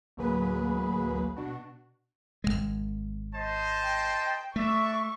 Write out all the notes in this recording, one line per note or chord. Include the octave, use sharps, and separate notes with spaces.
A1 D2 F#3 A#3 G#4 B4
B2 D4 F#4
G#1 E2 G#3
C5 D#5 A5
G5
A3 D4 E5 C#6